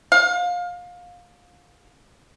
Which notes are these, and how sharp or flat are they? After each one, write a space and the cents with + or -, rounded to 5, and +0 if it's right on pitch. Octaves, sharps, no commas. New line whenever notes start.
F5 +25